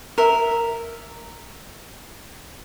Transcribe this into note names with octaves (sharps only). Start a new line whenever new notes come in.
A#4 E5